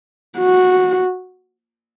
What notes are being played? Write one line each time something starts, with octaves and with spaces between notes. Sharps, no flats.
F#4